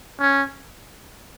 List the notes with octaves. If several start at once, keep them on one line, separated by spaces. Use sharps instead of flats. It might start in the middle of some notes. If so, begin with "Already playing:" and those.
C#4